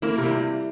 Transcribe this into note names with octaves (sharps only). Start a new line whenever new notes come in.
A#3 E4
C3
G3